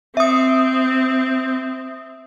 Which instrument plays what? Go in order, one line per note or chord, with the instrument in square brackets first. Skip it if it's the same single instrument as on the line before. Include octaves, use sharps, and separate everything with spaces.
[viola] C4 [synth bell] E5 D#6